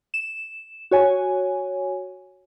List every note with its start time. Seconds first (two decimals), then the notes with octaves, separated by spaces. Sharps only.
0.14 E7
0.91 F#4 C#5 G#5